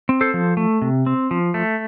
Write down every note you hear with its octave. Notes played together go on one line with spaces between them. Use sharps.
C4
A4 C5
F3
A3
C3
C4
F3
A3